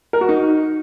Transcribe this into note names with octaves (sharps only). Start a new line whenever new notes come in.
A#4
F#4
D#4